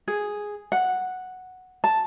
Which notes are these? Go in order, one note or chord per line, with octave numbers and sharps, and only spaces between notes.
G#4
F#5
A5